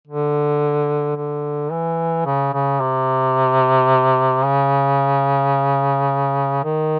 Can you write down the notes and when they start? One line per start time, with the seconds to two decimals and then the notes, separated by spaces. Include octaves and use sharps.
0.08 D3
1.16 D3
1.71 E3
2.26 C#3
2.53 C#3
2.81 C3
4.45 C#3
6.64 D#3